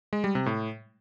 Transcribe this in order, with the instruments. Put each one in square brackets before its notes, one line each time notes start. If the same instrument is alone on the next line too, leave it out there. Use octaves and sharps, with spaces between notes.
[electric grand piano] G#3
G3
C3
A2